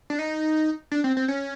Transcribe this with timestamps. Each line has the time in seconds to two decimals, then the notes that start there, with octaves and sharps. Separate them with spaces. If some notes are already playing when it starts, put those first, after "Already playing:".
0.10 D4
0.19 D#4
0.92 D4
1.04 C4
1.17 C4
1.28 C#4